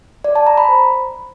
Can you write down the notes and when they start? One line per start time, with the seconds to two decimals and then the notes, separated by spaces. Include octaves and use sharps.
0.24 D5
0.35 A5
0.47 A#5
0.58 B5
0.69 C5